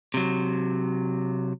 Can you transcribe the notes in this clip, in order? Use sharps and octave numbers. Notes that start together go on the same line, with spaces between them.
C3 F#3